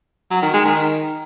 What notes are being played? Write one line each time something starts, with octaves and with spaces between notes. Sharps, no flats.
F#3
D#3
G#3
D#3